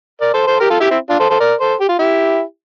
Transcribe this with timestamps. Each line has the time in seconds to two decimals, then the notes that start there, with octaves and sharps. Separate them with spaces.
0.21 A#4 D5
0.34 A4 C5
0.47 A4 C5
0.60 G4 A#4
0.70 F4 A4
0.80 E4 G4
0.91 C4 E4
1.10 D4 F4
1.20 A4 C5
1.30 A4 C5
1.40 A#4 D5
1.60 A4 C5
1.80 G4
1.89 F4
1.99 E4 G4